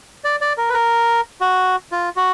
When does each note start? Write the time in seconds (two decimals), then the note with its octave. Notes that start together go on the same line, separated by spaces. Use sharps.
0.24 D5
0.41 D5
0.58 A#4
0.70 B4
0.74 A#4
1.41 F#4
1.92 F4
2.16 F#4